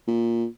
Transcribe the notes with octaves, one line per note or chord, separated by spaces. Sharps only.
A#2